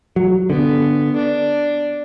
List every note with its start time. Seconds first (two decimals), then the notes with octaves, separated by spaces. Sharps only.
0.16 F#3
0.49 D3 B3
1.15 D4